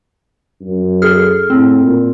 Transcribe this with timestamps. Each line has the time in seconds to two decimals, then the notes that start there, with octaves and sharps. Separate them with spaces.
0.61 F#2
1.02 G#4 A4 F6
1.50 A2 C4
1.82 A#2